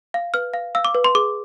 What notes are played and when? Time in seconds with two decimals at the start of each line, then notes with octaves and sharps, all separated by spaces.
0.14 F5
0.34 B4 F6
0.54 F5
0.75 F5 E6
0.85 D6
0.95 B4
1.04 C6
1.15 G#4 D6